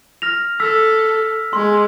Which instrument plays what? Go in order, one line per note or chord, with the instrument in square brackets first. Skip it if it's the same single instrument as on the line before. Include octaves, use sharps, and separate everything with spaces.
[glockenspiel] F6 A#6 F7
[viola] A4 [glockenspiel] E6 B6
[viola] G#3 [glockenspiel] C6